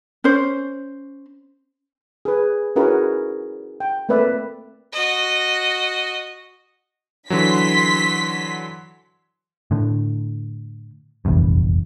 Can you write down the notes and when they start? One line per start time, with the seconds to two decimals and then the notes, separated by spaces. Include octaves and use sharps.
0.24 C#4 C5
2.25 G#4 B4
2.76 C#4 E4 F#4 G#4 A#4 B4
3.80 G5
4.09 A3 A#3 C4 B4 D5 E5
4.93 F#4 D#5
7.30 D3 E3 F#3 C6 B6
9.71 A2 D3
11.25 F1 A#1 E2 G2